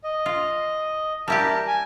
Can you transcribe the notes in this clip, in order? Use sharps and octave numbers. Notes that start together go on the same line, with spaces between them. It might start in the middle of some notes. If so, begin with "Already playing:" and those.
D#5
F4
G3 E4 G4 A#4 A5
G#5